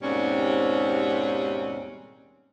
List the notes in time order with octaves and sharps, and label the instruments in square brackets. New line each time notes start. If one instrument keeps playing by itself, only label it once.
[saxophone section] D#2 G#2 B2 G3 C4 C#4